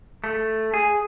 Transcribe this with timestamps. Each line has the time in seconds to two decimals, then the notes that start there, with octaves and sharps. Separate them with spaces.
0.24 A3
0.74 G#4